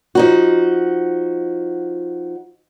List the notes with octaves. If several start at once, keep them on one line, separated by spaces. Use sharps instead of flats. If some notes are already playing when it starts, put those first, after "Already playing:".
F3 D#4 F#4